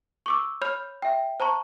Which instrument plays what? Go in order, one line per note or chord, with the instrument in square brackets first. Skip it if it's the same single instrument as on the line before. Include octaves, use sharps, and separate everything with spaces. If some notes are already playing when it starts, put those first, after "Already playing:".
[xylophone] C#6 D6 E6
C#5 B5 F6 G6 F7
E5 G5
C5 A5 A#5 C#6